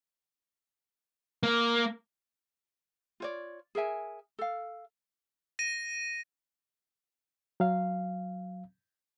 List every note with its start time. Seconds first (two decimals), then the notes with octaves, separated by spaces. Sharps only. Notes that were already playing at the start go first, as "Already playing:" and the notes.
1.43 A#3
3.20 F4 C#5 D5
3.75 G#4 A#4 E5 G#5
4.39 A4 F5
5.59 A#6 D#7
7.60 F#3 F5